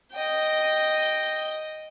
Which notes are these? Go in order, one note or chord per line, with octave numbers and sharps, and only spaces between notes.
D#5 G5